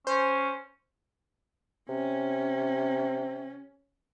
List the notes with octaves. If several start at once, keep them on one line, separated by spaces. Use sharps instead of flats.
C#4 C5
C3 C#4